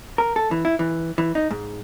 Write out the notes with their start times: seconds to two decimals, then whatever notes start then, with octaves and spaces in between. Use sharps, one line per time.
0.18 A#4
0.36 A4
0.51 E3
0.65 E4
0.79 E3
1.18 E3
1.35 D#4
1.51 G#2